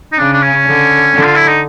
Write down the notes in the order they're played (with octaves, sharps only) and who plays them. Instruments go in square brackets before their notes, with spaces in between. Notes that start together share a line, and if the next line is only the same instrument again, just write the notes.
[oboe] D#4
[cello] C#3 [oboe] D4
[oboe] D4
C#4
[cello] D3
D3
[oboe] F4
E4
D#4